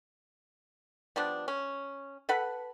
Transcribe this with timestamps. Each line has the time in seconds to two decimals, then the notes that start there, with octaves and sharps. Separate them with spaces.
1.16 F3 G3 B3 D4
1.48 C#4
2.29 A4 B4 F#5 B5